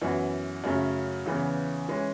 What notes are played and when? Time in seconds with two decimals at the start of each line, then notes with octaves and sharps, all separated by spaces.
0.02 F#2 E3 B3 F#4
0.64 F#2 C#3 F#3 A3
1.26 E2 C#3 E3 B3
1.89 E3 G#3 C#4